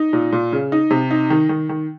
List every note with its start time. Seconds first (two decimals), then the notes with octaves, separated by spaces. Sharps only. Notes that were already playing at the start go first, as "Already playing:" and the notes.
Already playing: D#4
0.13 A#2
0.32 A#2
0.52 C#3
0.72 D#4
0.91 C3
1.11 D#4
1.30 D#3
1.49 D#3
1.69 D#3